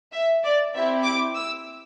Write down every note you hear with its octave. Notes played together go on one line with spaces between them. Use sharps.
E5
D5
C4 E4 G4 E5
D6
E6